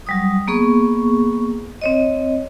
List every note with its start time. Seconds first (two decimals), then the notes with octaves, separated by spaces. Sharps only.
0.06 F#3 G3 D#6
0.48 A#3 B3 G#4 C#6
1.81 C4 C#5 D#5